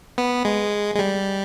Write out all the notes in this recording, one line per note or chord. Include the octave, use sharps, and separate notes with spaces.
B3
G#3
G#3
G3